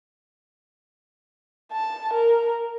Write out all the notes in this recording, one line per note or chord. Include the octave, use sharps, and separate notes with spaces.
A5
A#4